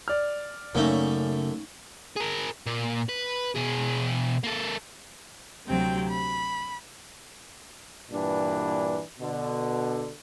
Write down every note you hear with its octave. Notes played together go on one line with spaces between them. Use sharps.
D5 F6
F#2 C#3 A3 A#3 C#4 D#4 E5
G#4 A#4
A#2
B4
B2 G#4
A#3 A4
D2 C3 F#3 C4 G4 G5
B5
G2 A#2 E3 D4
B2 D3